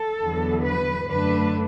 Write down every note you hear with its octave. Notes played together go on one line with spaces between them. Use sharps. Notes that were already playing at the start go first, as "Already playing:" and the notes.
Already playing: A4
E2 D3 F#3 B3
B4
F#2 D3 A3 D4 B4